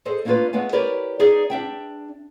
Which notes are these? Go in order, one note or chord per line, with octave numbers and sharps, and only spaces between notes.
G#4 A4 C5 D#5
A3 A#3 D4 D#4 F4 B4
G#3 A3 B3 F5 G#5
E4 G4 A#4 B4 C#5 D5
D#4 G#4 D5 E5
D4 E5 G5